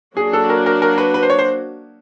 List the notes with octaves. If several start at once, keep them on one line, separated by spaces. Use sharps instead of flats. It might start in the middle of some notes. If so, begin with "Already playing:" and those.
F#3 A#3 D4 F#4 G#4
A4
A#4
A#4
A#4
B4
B4
C5
C#5
C5